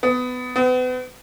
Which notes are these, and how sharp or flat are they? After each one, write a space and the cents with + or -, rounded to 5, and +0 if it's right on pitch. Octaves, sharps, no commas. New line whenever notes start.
B3 +20
B3 +40